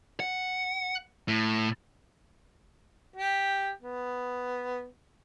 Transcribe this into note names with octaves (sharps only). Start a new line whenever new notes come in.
F#5
A2
G4
B3